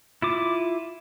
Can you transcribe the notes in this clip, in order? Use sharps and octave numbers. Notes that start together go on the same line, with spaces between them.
E4 F4 D6